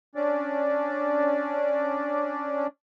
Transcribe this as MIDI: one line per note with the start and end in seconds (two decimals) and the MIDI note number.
0.15 2.67 61
0.15 2.67 62
0.15 2.67 74